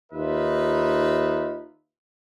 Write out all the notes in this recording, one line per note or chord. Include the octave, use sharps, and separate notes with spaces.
D#2 D#4 F4 B4 E5